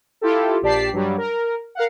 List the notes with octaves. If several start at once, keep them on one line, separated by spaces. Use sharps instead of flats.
E4 F4 G4 A4
A#1 G4 D5 A5 B6 C7
G2 F#3 G3
A#4
A#4 F5 F#5